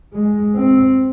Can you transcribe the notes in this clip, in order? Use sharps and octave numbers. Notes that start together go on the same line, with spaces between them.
G#3
C4